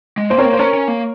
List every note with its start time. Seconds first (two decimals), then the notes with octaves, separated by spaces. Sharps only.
0.18 G#3
0.30 A#3 C5
0.38 C4 A#4 C#5
0.46 A#3
0.53 C5
0.59 C#4 A#4 C#5
0.74 C#4
0.88 A#3